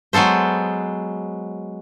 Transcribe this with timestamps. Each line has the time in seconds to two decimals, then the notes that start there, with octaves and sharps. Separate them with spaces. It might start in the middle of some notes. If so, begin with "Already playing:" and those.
0.13 F#3 G#3 B3 A4 C5